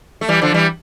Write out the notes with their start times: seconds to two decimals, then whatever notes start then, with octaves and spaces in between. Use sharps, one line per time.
0.21 A3
0.28 E3 G3
0.41 D3 F3
0.54 E3 G3